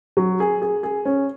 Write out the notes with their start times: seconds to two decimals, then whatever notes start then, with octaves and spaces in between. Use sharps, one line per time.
0.17 F#3
0.40 G#4
0.62 G#4
0.83 G#4
1.05 C#4